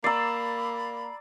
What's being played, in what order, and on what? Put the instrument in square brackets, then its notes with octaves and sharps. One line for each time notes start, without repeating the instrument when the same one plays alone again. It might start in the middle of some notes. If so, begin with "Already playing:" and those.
[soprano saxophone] A#3 [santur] D5 E6 [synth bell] A#5 C7 [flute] B5